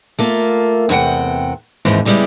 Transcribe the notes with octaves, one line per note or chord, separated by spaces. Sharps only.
A3 A#3 F4
E2 C3 C#4 F#5 G5
D#2 G#2 E3 C4
C#3 G3 G#3 B3 E4 G4